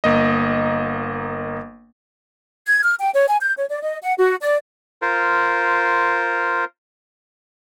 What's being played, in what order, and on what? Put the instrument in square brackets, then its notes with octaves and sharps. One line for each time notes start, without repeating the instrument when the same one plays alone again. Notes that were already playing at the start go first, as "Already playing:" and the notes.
[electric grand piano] G1 A#3 D#5
[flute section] G#6
F6
G5
C#5
G#5
G6
C#5
D5
D#5
F#5
F#4
D5
[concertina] F4 A#4 C5